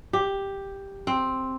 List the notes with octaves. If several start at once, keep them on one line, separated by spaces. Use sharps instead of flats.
G4
C4